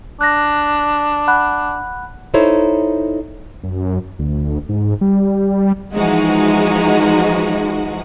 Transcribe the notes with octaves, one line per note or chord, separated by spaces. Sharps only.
D4 F#6 A#6
F#5 B5 F#6
D#4 E4 A4 C5 C#5 D#5
F#2
D2
G#2
G3
E3 F3 G#3 D#4 F#4